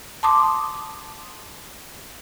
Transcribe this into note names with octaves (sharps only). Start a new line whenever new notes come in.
A5 C6 D6 D#6